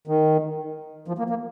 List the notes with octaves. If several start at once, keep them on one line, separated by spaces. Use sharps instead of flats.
D#3
F3
A#3
A#3